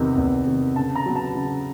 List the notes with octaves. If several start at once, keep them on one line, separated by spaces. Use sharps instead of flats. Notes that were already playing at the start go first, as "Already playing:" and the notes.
Already playing: E2 C3 D#3
E2
C3 D#3
C#3 A5
A#5
F#3 B3
A5
C#3